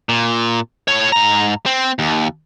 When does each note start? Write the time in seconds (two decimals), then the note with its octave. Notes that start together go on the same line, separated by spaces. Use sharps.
0.09 A#2
0.88 A2 C#5
1.12 G#2 A#5
1.66 C4
1.99 D#2